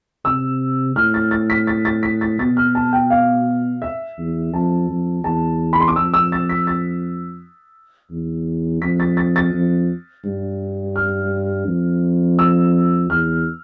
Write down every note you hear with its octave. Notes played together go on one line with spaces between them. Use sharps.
C3 E6
A2 F6
A6
A6
B6
A6
A6
B6
A6
B2 A6
F6
A5
G5
F5
E5
E2
F2 A5
F2
E2 A5
B5
C6
D6
F2 E6
E6
A6
B6
A6
E2
F2 B6
A6
A6
A6
F2
G2
F6
F2
E6
E2 F6